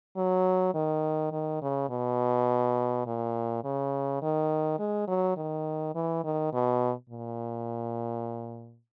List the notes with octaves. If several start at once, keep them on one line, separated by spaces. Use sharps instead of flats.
F#3
D#3
D#3
C#3
B2
A#2
C#3
D#3
G#3
F#3
D#3
E3
D#3
B2
A#2